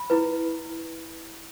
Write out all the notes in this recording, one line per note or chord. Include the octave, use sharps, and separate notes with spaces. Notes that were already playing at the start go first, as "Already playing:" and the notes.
Already playing: B5
E4 B4